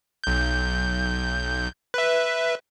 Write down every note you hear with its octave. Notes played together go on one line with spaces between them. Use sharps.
B1 G6
B4 E5